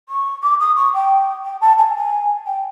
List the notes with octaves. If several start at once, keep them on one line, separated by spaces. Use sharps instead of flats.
C#6
D6
D#6
C#6
G5
G5
A5
G#5
G#5
G5